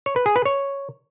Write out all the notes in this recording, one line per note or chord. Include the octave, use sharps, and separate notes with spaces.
C#5
B4
G#4
B4
C#5